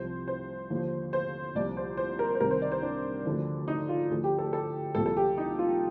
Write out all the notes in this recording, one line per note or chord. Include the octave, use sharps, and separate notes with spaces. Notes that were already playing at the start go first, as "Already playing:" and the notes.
Already playing: C2 C3 F3 C5
C5
D#2 D3 F3
C5
C2 A#2 F3 D5
C5
C5
A#4
C5
C2 C3 D#3 A#4
C5
D5
C5
D4
D2 D3 F3
D#4
F4
D2 D3 F3
G4
A4
A4
C2 A#2 F3 A4
A4
G4
D#4
F4